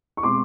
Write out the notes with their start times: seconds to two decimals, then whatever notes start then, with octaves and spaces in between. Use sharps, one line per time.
0.17 C#6
0.23 B2 G#3 C4 C6 D6